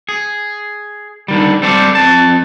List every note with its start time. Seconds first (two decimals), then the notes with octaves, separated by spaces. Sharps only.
0.09 G#4
1.28 D3 D#3 G3
1.62 G3 C4 A4 C5 D5
1.95 F2 C4 A5